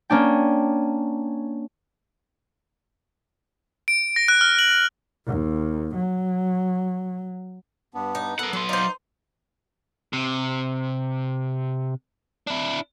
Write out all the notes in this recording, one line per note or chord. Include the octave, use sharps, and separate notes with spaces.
A#3 C#4 D4 G5
D7
A#6
F#6
F6
F#7
D#2
F#3
G2 B3 D4
D#4
B3 A4 A#4 F#5
F#3 B3 C6
D#4 C5 D5 F5
C3
D4 E4